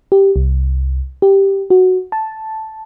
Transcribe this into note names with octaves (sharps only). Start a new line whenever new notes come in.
G4
C2
G4
F#4
A5